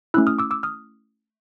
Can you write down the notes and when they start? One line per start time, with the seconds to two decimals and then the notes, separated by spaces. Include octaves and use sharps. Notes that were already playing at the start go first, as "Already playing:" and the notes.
0.14 A3 C#4 E4 E6 F#6
0.27 D#6 F6
0.38 D6 E6
0.51 D6 E6
0.63 D#6 F6